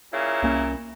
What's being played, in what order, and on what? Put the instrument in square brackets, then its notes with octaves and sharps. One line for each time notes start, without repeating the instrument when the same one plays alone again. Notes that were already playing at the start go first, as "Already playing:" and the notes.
[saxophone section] A#2 C#3 E4
[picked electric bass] C2 A#3 C#4